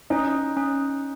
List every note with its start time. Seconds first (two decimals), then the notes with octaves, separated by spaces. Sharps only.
0.10 C#4 D#4
0.57 C#4